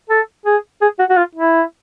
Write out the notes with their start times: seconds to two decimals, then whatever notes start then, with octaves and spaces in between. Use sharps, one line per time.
0.10 A4
0.46 G#4
0.82 G#4
0.99 F#4
1.10 F#4
1.17 F4
1.35 E4